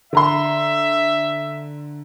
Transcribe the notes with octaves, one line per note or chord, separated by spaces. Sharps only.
D3 E5 A#5 C6